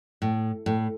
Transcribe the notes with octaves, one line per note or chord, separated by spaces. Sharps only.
A2
A2